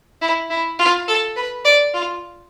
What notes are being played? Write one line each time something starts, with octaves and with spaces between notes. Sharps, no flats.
E4
E4
F4
A4
B4
D5
F4